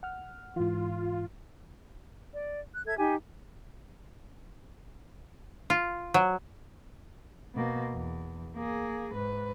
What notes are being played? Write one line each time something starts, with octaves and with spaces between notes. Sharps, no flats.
F#5 F6
G#2 E3 F4
D5
F#6
A4 E5 G#6
D#4 G4 G#5
F4
F#3
B2 A#3
E2
A#3 G#4
G#2 B4